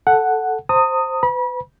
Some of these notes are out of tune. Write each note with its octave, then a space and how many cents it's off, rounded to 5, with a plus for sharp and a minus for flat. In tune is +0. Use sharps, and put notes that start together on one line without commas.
A4 +0 F#5 +0
C5 +0 A#5 -45 D#6 +0
B4 +35 B5 -35